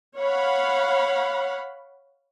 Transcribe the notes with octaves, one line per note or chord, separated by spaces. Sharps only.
C#5 F5 F#5 B5